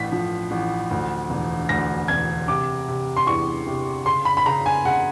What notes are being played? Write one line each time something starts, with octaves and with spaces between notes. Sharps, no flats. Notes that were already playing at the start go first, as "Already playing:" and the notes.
Already playing: A1 A2 B6
F3
A1
D2
E1
D2 A#6
E1 G#6
C3 D6
C3
C6
E2 C#6
C3
C#3 C6
B5
B5
C#3 A#5
G#5
C#3 F#5